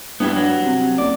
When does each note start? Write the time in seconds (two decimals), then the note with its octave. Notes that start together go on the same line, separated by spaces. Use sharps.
0.20 G2 B3 E4 G4
0.36 F#3
0.65 C3
0.98 F#1 D5